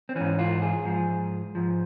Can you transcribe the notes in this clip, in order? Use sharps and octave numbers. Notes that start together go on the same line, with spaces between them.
C4
G#2 E3 C#4
F4
G#4
G#2 F3
G#2 F3